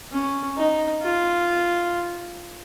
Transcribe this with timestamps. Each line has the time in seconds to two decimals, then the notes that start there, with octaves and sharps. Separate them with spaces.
0.12 C#4
0.57 D#4
1.02 F4